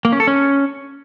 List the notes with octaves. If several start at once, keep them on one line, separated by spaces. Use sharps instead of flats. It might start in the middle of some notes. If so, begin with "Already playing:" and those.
A#3
C#4
A4
C#4